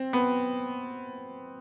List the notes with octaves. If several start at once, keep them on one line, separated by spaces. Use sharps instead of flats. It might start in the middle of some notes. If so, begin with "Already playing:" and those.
Already playing: C4
B3